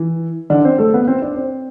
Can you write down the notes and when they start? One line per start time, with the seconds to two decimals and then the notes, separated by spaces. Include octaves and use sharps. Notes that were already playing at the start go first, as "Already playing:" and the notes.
Already playing: E3
0.50 D3 D4
0.65 C4 C5
0.78 A3 A4
0.94 B3 B4
1.08 C4 C5
1.22 D4 D5
1.36 C4 C5